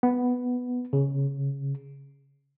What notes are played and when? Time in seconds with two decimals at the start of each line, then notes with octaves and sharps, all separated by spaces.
0.03 B3
0.93 C#3